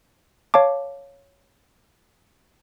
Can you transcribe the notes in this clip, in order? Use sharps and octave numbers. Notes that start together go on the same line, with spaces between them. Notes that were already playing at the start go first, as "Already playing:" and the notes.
C#5 F5 A5 D6